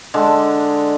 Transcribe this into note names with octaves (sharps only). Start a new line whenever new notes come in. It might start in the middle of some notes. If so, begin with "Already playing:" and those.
D3 G#3